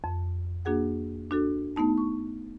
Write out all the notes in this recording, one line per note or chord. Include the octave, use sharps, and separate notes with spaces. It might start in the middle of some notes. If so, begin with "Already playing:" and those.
F2
A#3 D4 F#4 G#4 F#5
D4 F#4 A4
A3 B3 D#4 A5
C#6